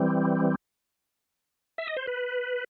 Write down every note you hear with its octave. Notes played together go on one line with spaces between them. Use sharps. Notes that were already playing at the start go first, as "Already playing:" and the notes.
Already playing: E3 G3 C4
E5
D#5
C5
B4